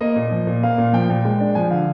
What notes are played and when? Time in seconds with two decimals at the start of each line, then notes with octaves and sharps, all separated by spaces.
0.01 A#3 D#5
0.16 A#2
0.31 F3
0.47 A#2
0.63 A#3 F5
0.78 A#2
0.93 F3 G5
1.10 A#2
1.25 G#3
1.40 D4
1.55 F3 G#5
1.71 D3 F5